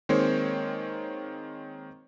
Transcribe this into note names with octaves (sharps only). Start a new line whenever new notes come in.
D#3 G#3 A#3 C4 C5 C#5